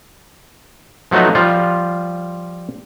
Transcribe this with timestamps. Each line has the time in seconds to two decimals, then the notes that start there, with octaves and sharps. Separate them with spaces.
1.11 F3 F#3 A3 B3 D#4
1.35 F3 G3 F4